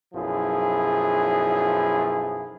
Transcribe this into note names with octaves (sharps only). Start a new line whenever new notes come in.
B1 F#2 F3 E4 G#4